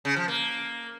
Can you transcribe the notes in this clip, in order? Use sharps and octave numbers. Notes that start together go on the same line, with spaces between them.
C#3
F3
A#3